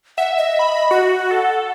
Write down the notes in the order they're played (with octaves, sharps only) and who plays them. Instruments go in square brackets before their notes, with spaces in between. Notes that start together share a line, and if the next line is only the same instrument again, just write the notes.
[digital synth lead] E5 [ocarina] F#5
[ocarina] D#5
[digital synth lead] B5
[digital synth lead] F#4 [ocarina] F#5
[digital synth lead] A4